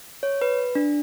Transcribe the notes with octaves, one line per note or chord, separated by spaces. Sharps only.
C#5
B4
D4